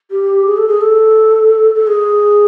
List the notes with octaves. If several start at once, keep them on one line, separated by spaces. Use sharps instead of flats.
G4
G#4
A4
G#4
A4
A4
G#4